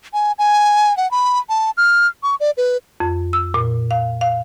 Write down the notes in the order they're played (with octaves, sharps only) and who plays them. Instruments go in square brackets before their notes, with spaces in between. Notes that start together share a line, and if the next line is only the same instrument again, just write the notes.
[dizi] G#5
G#5
F#5
B5
A5
F6
C#6
D5
B4
[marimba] F2
E6
A#2
F5
F5